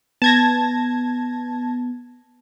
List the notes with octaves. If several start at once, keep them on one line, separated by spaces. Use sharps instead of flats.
B3 A5 G#6 A#6